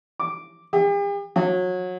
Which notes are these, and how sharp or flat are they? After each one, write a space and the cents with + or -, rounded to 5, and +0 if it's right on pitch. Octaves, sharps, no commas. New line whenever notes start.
D6 -5
G4 +45
F#3 -25